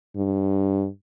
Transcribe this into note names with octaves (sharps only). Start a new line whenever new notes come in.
G2